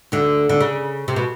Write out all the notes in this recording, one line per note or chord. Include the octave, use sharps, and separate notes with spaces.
D2 D3
D3
C#3
C3
B2